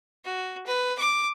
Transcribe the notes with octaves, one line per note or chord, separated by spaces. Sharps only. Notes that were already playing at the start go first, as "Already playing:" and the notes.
F#4
B4
D6